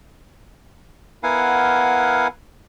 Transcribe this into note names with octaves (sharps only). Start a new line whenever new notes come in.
B3 E4 A#4 F5 F#5 G#5